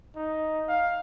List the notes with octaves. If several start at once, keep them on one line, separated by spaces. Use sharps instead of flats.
D#4
F5